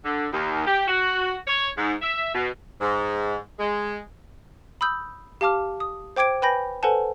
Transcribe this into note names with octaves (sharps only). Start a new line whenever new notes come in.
D3
D#2
G4
F#4
C#5
G#2
E5
B2
G#2
G#3
B5 D#6 E6 G6
G4 F5 A5 D6 F6
D#6
C5 G5 D6 G#6 D7
B4 G5 G#5 B5 G6 A#6
A4 B4 C5 F#5 G#5 A5